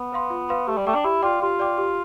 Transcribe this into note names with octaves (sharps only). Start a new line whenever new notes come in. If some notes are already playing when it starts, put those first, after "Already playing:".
Already playing: B3
B4 F5 C6
F4
B4 F5 C6
A3 G4
G3
A3 D5 G5 D6
D4
E4 G4
F4 D5 G5 D6
F4 G4
D5 G5 D6
G4